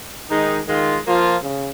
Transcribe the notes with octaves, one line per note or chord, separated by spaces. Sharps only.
D#3 G#3 D#4
D#3 G#3 F4
F3 A#3 F4
C#3